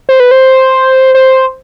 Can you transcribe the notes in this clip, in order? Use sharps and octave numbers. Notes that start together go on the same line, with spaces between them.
C5
B4
C5
C5